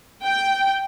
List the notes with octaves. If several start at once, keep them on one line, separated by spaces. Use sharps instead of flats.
G5